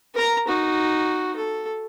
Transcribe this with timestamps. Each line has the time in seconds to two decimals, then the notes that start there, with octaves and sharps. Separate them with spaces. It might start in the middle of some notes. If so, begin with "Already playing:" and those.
0.14 A#4 A#5
0.48 D#4 F#4
1.36 A4